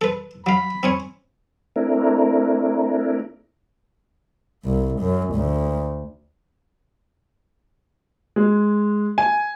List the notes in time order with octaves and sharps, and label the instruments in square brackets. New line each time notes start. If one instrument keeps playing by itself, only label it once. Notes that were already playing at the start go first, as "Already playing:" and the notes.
[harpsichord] A4 B4
[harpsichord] F#3 F5 [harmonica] B5
[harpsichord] C4 C#4 C#5
[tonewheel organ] A3 C4 D4 E4 A#4
[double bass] C2
F#2
D2
[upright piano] G#3
G#5